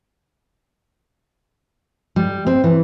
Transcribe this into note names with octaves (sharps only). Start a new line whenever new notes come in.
G3
C4
E3